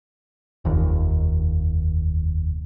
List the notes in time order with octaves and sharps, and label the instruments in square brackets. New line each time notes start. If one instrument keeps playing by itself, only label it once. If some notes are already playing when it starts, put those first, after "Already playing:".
[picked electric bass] F1 D#2